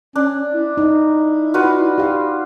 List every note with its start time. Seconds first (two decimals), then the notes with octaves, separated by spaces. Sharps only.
0.16 C#4 D4
0.54 E4
0.78 D#4
1.54 F4 F#4 B4
1.98 G4 F5